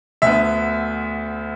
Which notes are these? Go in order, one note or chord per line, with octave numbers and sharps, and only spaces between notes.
D2 D3 B3 E5